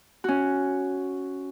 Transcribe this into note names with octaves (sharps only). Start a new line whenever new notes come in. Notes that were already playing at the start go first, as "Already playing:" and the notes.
C#4 F#4